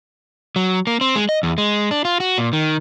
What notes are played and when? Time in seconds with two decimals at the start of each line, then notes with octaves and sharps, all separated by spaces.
0.56 F#3
0.87 A#3
1.01 C4
1.15 G#3
1.29 D#5
1.43 E2
1.58 G#3
1.91 D4
2.05 F4
2.20 F#4
2.38 A#2
2.53 D#3